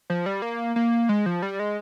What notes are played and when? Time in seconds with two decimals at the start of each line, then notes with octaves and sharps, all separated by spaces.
0.10 F3
0.26 G3
0.42 A#3
0.76 A#3
1.09 G#3
1.26 F3
1.42 G3
1.59 G#3